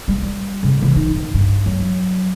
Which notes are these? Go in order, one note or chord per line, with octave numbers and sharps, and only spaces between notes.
G3
C#3
E3
D#4
D#3
G2
F#3